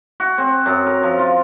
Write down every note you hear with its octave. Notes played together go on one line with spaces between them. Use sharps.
F#4
C4
F#2
A#4
F3
F4